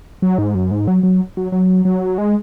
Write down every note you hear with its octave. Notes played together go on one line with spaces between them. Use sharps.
F#3
G#2
F#2
G#2
F#3
F#3
F#3
F#3
F#3
G#3